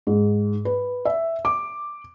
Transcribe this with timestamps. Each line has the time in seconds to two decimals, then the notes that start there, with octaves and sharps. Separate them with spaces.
0.07 G#2
0.65 B4
1.05 E5
1.45 D6